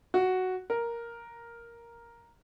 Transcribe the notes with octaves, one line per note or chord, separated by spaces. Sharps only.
F#4
A#4